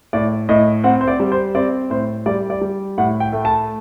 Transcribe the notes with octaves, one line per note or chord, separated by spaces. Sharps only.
A2 D5
A2 D#5
C4 F#5
C5
D5
G3
C5
C4 D5
A2 C5
G3 D5
D5
G3
A2 F#5
G5
A3
A5